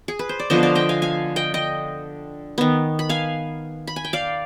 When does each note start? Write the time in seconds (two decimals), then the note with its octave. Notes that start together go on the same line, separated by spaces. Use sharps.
0.08 G#4
0.19 B4
0.29 C5
0.40 D5
0.50 D3 F3 B3 C5 D#5
0.63 D5 F5
0.75 D#5 G5
0.89 F5 G#5
1.02 F5 G#5
1.36 D#5 G5
1.54 D#5 G5
2.58 D#3 B3
2.99 B5
3.09 F5 G#5
3.87 B5
3.96 G#5
4.05 G5
4.13 D5 F5